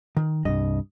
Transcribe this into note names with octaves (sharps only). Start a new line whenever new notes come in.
D#3
C2 G2 D#5